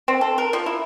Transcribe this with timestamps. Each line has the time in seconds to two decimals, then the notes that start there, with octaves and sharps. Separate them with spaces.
0.08 C4
0.21 A4
0.38 A#4
0.53 F3
0.66 E4